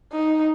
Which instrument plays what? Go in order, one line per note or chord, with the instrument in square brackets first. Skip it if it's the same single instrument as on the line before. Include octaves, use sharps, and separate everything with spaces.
[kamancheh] D#4